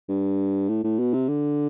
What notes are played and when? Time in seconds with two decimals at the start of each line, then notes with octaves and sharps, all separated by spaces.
0.09 G2
0.69 A2
0.84 A2
0.99 B2
1.14 C3
1.29 D3